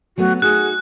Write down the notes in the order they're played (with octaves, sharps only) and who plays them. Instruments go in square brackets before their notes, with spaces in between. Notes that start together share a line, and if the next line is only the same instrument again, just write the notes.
[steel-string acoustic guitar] F#3 A3 B3 [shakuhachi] F#4
[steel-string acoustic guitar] D#4 F#4 [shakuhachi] G#4 [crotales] F#6